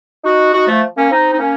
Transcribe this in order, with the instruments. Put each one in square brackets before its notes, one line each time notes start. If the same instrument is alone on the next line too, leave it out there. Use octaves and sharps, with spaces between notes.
[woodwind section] D#4 F#4
D#4 F#4
F3 A3
A#3 C#4
C4 D#4
D#4
A#3 C#4